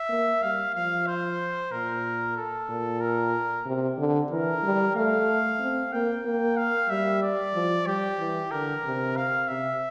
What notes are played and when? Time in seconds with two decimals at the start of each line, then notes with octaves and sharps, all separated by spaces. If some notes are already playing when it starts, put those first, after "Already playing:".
Already playing: E5
0.09 A#3
0.42 G3 F5
0.74 F3 F5
1.07 C5
1.72 A#2 A#4
2.37 A4
2.69 A#2
3.01 A#4
3.66 C3
3.98 D3
4.31 E3 A#4
4.63 G3
4.95 A3 F5
5.60 C4
5.93 A#3 G5
6.25 A#3
6.57 F5
6.89 G3 E5
7.22 D5
7.54 F3
7.86 G3 G4
8.19 E3
8.51 D3 A#4
8.84 C3
9.16 F5
9.48 C3 E5